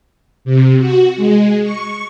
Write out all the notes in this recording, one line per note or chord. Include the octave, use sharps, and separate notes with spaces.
C3
F#4
G#3
C#6